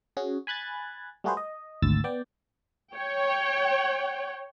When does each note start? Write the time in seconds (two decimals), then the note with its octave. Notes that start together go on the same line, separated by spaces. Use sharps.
0.17 C#4 F#4 G#4
0.47 G#5 B5 F#6 G#6 A6
1.24 G3 A3 F#4 G#4 B4 C5
1.37 D#5
1.82 G#1 D2 E6 A6
2.04 B3 D5 G5
2.95 C#5 G5